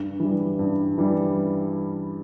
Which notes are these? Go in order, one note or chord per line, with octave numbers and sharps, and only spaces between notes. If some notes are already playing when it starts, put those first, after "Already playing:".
Already playing: G2
E3 G3
G2
E3 G3